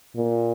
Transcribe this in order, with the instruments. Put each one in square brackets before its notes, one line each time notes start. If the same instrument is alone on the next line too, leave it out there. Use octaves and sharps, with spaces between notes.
[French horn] A#2